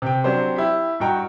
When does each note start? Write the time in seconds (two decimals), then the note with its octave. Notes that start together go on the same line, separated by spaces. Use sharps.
0.02 C3 G5
0.24 F#3 C4 D4 G4 C5
0.56 E4 G4
1.00 G2 D#4 F#4 G5 A#5